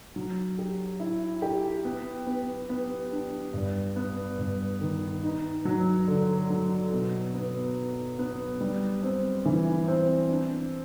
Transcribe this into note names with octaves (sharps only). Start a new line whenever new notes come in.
F#3
G4
E4
G4
B3
B3
B3
D4
G2
B3
G2
D#3
D#4
F#3
D3
F#3
B2
B3
B3
B3
G3
C4
E3
C4
D4